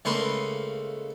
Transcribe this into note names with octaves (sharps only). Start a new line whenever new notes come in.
C#2 A3 A#3 B4 C6 C#6